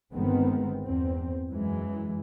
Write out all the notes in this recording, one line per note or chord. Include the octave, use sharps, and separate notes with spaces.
G1 D#3 G#3 B3 C4
E2 C4
F#2 E3 G#3